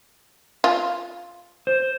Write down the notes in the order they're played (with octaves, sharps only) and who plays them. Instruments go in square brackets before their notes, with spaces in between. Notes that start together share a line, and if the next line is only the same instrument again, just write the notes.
[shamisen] F4
[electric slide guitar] C5